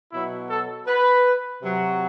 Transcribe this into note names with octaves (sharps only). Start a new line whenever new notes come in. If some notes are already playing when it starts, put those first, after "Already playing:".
B2 F#3 E4
A4
B4
C3 F#3